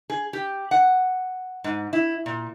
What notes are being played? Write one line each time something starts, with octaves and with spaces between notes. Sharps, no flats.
G#4
G4
F#5
G#2
E4
A#2